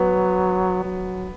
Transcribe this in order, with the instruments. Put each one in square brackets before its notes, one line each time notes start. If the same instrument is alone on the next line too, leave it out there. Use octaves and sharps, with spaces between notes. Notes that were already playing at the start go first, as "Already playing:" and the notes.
Already playing: [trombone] F#3 [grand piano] B3
[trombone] F#3